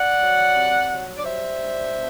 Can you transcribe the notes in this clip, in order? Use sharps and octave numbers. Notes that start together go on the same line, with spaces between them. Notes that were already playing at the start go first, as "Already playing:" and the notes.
Already playing: D5 F#5
F#3
C3
F#3
D5
G3 C5 E5
D4
B2